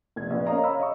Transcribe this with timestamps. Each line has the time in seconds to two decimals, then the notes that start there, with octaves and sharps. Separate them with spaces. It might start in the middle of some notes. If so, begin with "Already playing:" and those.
0.16 F1 G#6
0.30 A#1 B3
0.47 C#4 A#4 C#5 D#5 F5 A#5
0.63 C#5 F5 A#5 B5 E6
0.80 D#5 C#6